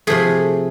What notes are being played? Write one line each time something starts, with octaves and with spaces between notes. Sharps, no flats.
C3 F3 A3 G#4